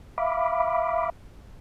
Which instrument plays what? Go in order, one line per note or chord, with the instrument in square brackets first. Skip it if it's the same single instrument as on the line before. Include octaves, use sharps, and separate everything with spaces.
[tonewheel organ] E5 F5 B5 D6